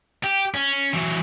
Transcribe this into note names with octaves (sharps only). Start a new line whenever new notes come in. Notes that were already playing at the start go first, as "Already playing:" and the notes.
G4
C#4
E3 F#3